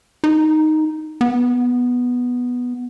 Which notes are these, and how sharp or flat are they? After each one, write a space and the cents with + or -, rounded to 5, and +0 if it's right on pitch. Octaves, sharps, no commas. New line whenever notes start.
D#4 +0
B3 -5